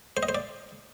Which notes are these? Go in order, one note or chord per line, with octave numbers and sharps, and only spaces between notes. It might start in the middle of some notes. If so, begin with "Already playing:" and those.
C5
D#5
C5
D5